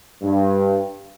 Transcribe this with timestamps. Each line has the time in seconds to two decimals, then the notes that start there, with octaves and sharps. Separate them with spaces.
0.22 G2